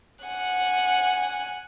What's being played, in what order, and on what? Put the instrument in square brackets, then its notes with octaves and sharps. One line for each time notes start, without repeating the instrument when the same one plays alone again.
[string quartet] F#5 G#5